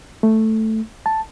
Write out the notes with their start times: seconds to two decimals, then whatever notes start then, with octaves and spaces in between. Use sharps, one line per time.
0.23 A3
1.06 A5